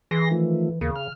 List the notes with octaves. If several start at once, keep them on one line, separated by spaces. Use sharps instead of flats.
E3 G#4 C6 A#6
D#3 F3 A3
D#2 C#3 A#3
F6